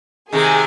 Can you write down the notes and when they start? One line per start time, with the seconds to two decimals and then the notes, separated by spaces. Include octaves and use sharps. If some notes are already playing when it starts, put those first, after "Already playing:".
0.32 C3 D#3 G#4